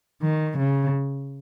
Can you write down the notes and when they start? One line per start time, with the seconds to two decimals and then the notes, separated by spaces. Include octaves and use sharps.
0.22 D#3
0.58 C#3